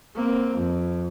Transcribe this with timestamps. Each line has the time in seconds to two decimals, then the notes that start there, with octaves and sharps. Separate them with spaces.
0.15 A#3 C4
0.55 F2